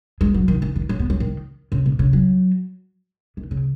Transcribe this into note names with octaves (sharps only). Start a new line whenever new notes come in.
G#3
F#3
D#3
D#3
D#3
F#3
B3
F#3
D#3
C#3
B2
C#3
F#3
D#3
C#3